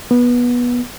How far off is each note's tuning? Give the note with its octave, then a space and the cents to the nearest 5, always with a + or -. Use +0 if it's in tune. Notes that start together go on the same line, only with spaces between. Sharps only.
B3 -20